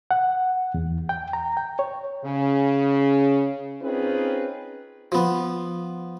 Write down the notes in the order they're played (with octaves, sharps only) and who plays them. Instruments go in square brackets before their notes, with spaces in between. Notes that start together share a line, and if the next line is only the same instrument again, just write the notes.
[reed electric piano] F#5
E2
G5
A#5
G5
C#5
[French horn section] C#3
C4 C#4 D#4 F4 G#4 B4
[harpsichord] F3 B3